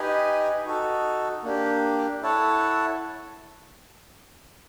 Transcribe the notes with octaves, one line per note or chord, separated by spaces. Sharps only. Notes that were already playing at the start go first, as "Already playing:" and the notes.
Already playing: D#4 G4 B4 D#5 G#5
D#4 F#4 A4
A#3 D4 G4
E4 A4 C#5 F#5 A5